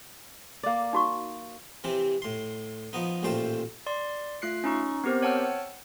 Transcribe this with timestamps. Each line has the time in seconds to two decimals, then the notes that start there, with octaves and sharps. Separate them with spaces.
0.63 A#3 D5
0.93 D#4 F#4 C#6
1.84 C3 E3 C4 G4
2.22 A2 C6
2.93 F3 B3 D#4
3.23 A1 A#2 A3 C5 G5 A5
3.86 D5 C6
4.42 A3 F4 F#6 C7 C#7
4.64 C#4 D#4 C#6
5.04 B3 C4 G4 A#4 C5
5.22 C#5 F#5 G5 A5 E6 F6
5.44 C#7